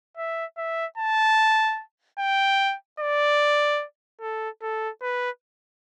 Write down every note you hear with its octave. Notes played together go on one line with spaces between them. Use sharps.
E5
E5
A5
G5
D5
A4
A4
B4